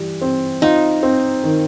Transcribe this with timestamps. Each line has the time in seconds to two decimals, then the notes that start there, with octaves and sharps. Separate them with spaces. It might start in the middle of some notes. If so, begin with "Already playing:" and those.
Already playing: E3 G3
0.22 C4
0.62 D#4 F4
1.03 C4
1.43 D#3